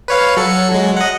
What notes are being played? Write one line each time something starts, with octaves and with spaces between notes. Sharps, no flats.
B4 C#5 F5
F#3 A4 C#7
F#3 G#3
D#5 F#5